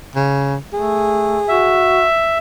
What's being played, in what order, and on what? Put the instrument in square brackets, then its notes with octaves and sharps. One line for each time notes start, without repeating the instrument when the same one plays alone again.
[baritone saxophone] C#3
[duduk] A3 [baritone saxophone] G#4
[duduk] F#4 [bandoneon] E5